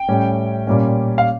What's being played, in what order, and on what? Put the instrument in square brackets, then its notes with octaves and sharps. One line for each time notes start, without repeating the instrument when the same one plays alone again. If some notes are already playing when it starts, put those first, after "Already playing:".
Already playing: [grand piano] G5
A2 G3 C#4
A#2 G3 C#4
F5